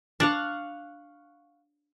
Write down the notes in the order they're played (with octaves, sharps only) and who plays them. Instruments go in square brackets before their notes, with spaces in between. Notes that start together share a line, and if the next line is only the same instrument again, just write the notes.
[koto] D4 [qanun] F5 F#5 C#6